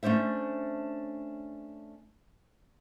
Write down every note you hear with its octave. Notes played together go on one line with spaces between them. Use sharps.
A3 C#4 D4 C5 E5